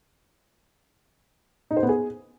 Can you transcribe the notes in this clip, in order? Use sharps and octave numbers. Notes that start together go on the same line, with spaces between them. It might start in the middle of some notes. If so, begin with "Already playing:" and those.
D#4
C5
B3
G#4